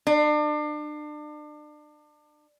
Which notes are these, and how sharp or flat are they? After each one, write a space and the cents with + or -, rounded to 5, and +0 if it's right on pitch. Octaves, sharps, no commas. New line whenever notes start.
D4 +35